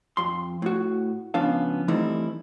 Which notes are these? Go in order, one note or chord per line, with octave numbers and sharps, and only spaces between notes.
F2 C6
A2 F#4
C#2 F3 B3 C#4 D4 F5
E3 G3 A3 C4 D#4 E4